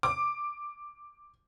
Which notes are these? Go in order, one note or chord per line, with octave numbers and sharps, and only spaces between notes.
D6